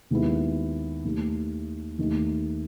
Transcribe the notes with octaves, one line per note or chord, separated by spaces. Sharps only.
D#2 D#3 G#3 B3 E4
D#2 D#3 A3
D#2 D#3 A3 D#4